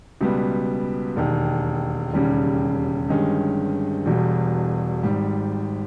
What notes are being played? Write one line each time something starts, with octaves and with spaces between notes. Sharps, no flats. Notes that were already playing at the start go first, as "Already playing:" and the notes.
C#2 B2 G3 B3
E1 D#2 D#3
E1 D#2 C#3 G3 C#4
G1 G2 D#3 G#3 C#4
E1 E2 B2 G3
G#1 G#2 G3